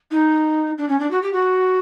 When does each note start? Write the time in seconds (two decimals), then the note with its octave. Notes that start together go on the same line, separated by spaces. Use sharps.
0.11 D#4
0.78 D4
0.89 C#4
1.00 D4
1.11 F#4
1.22 G4
1.33 F#4